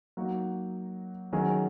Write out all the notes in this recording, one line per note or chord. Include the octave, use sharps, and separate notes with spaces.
F#3 A#3 D#4 F#4
D#3 F#3 C#4 G#4